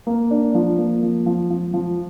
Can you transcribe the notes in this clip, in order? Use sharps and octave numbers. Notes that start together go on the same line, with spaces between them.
A#3
D4
F3
A#3
F3
F3
F3
F3